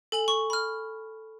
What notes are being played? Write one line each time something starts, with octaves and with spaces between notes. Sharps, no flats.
A4 G#5 F#7
C#6
B5 F6